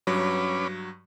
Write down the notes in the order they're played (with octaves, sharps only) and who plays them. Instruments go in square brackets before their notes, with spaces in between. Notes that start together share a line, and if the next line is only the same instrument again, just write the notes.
[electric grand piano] G2 F#3 [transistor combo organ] C#4 B4 D6